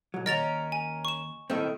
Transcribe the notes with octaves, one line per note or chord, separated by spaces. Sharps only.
B1 F#3
D#2 C#4 A#4 D#5 A6 F7
G#5
C#6 E7
A2 D#3 A3 C4 E5